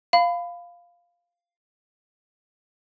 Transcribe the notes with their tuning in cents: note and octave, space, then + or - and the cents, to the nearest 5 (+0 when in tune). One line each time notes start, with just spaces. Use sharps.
F5 +0 B5 +20